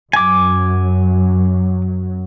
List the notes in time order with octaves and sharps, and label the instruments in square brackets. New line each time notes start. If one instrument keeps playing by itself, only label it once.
[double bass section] F#2 F#3 [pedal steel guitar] G#5 D6